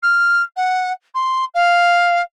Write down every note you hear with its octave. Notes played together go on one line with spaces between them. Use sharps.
F6
F#5
C6
F5